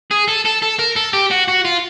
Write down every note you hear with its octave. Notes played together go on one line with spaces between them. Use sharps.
G#4
A4
A4
A4
A#4
A4
G4
F#4
F#4
F4